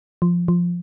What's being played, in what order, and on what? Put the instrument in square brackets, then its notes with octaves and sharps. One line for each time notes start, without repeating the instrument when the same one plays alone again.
[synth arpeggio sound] F3
F3